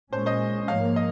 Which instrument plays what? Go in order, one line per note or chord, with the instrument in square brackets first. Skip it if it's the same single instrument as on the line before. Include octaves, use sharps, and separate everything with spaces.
[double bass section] A#2 G#3 C#4 [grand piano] C5
[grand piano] C5 D#5
[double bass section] G#2 F3 A#3 [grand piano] C#5 F5
[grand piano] D#5